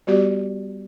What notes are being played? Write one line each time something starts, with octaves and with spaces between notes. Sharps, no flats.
G3 B3 F#4 G4 D5